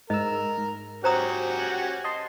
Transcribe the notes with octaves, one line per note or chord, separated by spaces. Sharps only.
G#2 A#4 D#5 E6
G#2
C#4 F#4 G4 C5 A#5 D#6
D#5 A5 C6